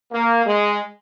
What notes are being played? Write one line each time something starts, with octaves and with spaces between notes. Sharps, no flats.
A#3
G#3